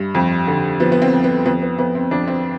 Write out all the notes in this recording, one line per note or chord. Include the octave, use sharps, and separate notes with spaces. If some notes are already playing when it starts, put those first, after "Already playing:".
Already playing: G2
F2
D3
F3 B3
B3
C4
F2
B3
F2 B3
B3
F2 B3
C4
F2 D4
C4